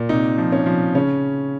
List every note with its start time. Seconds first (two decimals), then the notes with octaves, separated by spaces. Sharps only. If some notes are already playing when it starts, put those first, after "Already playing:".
Already playing: A#2
0.09 C3 D#4
0.38 F3
0.52 C#4
0.66 F3
0.95 C#3 C#4